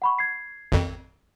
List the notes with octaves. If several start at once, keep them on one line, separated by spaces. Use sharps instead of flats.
F#5 B5 C#6
G#6 C7
G#1 F2